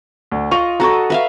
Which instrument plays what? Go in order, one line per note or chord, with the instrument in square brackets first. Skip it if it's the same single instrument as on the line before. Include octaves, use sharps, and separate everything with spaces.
[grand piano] D2
[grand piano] F4 C#6 F7 [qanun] D#5
[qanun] F#4 A4 D#5 [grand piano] A#5 C#6
[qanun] B4 E5 F5